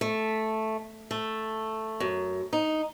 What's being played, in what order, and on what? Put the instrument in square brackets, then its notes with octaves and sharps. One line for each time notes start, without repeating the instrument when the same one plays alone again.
[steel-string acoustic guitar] A3
A3
F#2
D#4